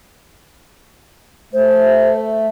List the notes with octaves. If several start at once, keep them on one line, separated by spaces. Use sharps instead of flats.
A3 C5